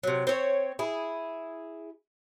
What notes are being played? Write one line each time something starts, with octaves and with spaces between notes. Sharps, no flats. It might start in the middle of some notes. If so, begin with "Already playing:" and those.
C3 F#3
C4 C#5
E4 G#4